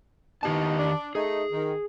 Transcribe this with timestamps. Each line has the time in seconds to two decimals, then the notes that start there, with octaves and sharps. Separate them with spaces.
0.43 D#3 B3 D#4 G4 A5
0.79 D4
1.15 A3 D#4 G#4
1.52 D#3